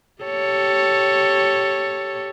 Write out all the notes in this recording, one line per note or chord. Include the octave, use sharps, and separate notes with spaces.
G4 A4 C#5